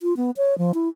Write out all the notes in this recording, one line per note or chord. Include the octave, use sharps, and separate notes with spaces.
F4
B3
C#5
F3
E4